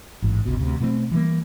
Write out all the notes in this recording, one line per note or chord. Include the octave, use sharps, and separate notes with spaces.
A1 G#2
G#1 C#2 B2
D2 C3
B2 A3 A#3 C4
E3 G3 G#3 A#3